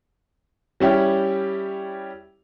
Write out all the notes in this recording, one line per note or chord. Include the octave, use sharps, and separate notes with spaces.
G3 C#4 E4 G4